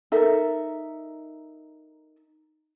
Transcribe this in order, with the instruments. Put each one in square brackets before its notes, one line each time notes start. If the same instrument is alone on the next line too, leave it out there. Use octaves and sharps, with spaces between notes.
[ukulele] D#4 A4 A#4 E5